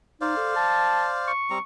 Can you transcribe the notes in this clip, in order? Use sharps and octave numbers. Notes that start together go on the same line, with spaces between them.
D#4 C5 D5 F5
A4
A5
C#6
G3 C4 A#5